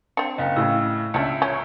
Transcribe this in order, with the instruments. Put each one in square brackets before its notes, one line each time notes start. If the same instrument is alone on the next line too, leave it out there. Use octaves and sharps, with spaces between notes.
[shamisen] C4 D4 [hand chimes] C#7
[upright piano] F#1 [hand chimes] D#5 F5 G5
[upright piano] A2 C#3 [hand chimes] E6
[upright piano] C#2 E5 [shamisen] C#4 D4 [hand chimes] C#7
[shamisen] C#4 [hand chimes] C#6